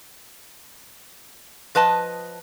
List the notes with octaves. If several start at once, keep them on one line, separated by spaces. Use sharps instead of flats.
F3 B4 D#5 A5